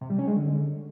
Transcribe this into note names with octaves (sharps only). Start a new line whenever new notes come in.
C3
G3
C#4
G#3
D3